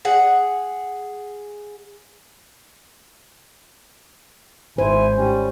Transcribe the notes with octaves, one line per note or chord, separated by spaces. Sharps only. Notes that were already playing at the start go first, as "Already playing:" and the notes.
G#4 F#5
G#1 E4 C5 G#5
G3 C#4